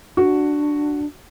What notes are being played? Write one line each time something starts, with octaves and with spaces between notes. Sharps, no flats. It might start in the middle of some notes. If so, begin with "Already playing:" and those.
D4 F#4